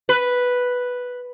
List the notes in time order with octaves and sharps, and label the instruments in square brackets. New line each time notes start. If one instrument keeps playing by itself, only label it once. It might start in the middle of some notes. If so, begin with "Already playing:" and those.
[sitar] B4